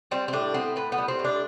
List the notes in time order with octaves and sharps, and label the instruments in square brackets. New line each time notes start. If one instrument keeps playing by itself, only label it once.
[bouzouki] G3 C4
C4
A2 D4
B3 C4
A2 B3
B3
G3
C4
A2
D4